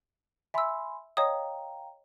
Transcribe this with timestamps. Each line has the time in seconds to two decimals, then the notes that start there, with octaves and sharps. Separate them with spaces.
0.54 E5 G#5 B5 C6 E6
1.17 C#5 D#5 F5 G5 A#5 D#6